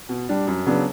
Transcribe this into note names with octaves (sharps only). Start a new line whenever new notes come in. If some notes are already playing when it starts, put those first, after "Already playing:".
B2
G3 D4
F#2
C#3 F#3 B3 D4